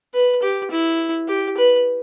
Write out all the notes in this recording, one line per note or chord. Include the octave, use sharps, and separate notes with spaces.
B4
G4
E4
G4
B4